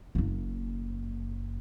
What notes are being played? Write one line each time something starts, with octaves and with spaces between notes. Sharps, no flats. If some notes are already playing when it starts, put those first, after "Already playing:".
F#1 A#3